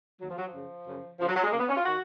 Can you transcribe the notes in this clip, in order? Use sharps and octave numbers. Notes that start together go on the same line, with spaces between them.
D#2 D#3 F#3
F3
F#3
F3
F#2 C#3
F#2 C#3
F#2 C#3 F3 F#3
F#3
G#3
F#2 C#3 A#3
B3
C#4
F4
D#3 F#4